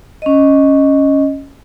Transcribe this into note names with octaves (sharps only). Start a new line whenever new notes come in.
C#4 D#5